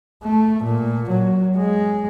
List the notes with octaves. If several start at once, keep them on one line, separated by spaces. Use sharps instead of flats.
A3
A#2
F#3
G#3